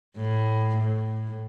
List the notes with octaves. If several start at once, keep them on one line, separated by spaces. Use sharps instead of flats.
A2
A2